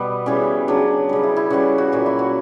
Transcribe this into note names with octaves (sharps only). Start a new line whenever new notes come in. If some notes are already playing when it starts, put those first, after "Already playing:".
Already playing: B2 G3 B3
C#3 E3 G3 C#4
C#3 F#3 D4
C#3 G3
E4
E4
C#3 E3 G3 F#4
F#4
A#2 F#3 F#4
E4
F#4